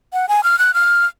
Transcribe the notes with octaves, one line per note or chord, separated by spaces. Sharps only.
F#5
G#5
F6
F#6
F6